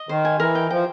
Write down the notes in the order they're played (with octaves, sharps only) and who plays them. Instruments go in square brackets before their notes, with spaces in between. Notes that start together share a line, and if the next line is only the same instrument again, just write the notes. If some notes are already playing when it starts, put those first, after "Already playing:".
Already playing: [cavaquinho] D#5
[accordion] D#3 [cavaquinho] C5
[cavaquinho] G#5
[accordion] E3 [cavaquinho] A#4
[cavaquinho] G5
[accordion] F3 [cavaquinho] G5